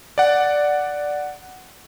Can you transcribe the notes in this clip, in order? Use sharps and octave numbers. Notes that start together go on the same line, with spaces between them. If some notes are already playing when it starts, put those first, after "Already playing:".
D5 F#5